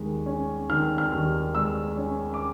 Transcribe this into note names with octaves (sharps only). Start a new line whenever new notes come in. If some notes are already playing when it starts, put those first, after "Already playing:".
Already playing: D#2 D#3 G#3
C#4
D#3 F6
F6
D#2
G#3 E6
C#4
D6